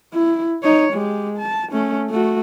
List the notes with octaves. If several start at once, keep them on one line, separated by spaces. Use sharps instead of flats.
E4
D#4 C#5
G#3 G4
A5
A3 C#4
A3 F#4